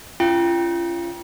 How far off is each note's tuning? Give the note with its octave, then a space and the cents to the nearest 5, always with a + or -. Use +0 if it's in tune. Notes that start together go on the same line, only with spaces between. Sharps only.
C#4 +15 F4 -35 G5 +0